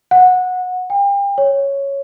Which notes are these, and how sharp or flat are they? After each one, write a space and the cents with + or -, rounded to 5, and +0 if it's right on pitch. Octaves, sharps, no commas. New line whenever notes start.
F#5 -15
G5 +35
C#5 -5